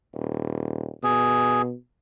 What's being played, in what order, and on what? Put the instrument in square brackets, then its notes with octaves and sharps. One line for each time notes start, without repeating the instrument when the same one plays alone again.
[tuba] D#1
[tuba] B2 [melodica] G#4